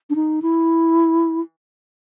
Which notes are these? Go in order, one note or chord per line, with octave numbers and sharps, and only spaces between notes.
D4
D#4
E4